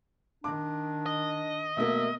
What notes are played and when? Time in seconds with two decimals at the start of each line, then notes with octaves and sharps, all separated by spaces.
0.44 D#3 D4 D6
1.06 D#5
1.77 B2 A3 A#3 E5